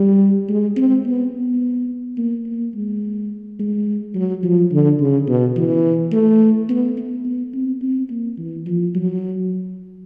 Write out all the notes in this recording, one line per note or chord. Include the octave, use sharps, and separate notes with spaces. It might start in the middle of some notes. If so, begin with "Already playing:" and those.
Already playing: G3
G#3
C4
B3
B3
A#3
A#3
G#3
G#3
F#3
F3
D3
C#3
B2
E3
A3
B3
B3
B3
C4
C4
A#3
E3
F3
F#3